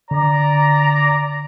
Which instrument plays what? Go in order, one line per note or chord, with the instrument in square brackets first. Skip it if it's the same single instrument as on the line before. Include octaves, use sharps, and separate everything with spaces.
[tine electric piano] D3 [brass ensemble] D5 A#5